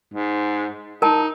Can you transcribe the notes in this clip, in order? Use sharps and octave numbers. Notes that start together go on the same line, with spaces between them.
G#2
D#4 A#4 A5